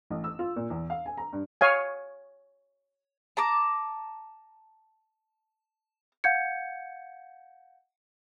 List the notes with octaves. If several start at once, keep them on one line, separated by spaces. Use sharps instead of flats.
A1
E6
F4
A#2
E2
F5
G#5
A#5
G2
C#5 F5 G#5
A5 A#5 D6
F5 F#5 G6 G#6 C#7